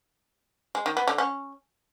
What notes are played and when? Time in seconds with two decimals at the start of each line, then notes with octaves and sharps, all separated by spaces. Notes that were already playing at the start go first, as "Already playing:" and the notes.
0.75 G#3
0.86 D#3
0.97 B3
1.08 D3
1.18 C#4